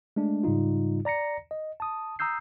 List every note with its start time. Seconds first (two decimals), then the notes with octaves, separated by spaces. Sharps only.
0.16 G#3 A3 D4
0.43 G#2 C#3 G3 D#4 F4
1.05 D5 A#5 A#6 C#7
1.51 D#5
1.80 A5 D#6
2.19 A#5 D#6 E6 G6 C7